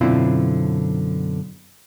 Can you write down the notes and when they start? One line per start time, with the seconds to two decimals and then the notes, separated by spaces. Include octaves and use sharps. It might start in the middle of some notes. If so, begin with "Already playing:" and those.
0.01 F#2 B2 D3 C4 E4 F4